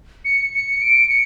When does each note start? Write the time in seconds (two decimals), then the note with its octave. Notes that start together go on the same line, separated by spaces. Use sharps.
0.25 C#7
0.52 C#7
0.81 D7
1.09 C#7